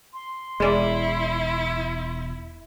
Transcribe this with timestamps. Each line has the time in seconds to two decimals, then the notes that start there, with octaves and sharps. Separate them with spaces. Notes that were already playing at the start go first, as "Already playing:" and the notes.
0.13 C6
0.60 E1 G#3 E4 D5